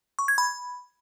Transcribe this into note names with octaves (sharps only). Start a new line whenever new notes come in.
C#6
G#6
B5